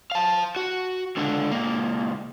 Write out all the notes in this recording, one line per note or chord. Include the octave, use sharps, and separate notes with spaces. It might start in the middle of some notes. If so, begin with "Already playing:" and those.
F5 A5
F#4
C#2 D3
C#2 A#3